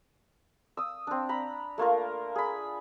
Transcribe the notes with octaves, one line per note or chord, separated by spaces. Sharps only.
D#6 E6
C4 D4
A#5 B5
A3 A#3 F4 A#4
G#4 B5